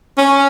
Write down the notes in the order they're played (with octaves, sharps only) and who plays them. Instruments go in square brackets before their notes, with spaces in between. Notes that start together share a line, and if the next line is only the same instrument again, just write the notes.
[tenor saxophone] C#4